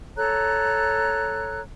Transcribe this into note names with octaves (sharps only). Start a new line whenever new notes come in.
A4 C#5 A#5 F#6